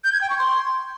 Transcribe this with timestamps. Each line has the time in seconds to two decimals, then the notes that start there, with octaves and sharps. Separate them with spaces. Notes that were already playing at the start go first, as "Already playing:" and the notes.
0.04 G6
0.13 G#6
0.21 G5
0.30 C#6
0.38 C6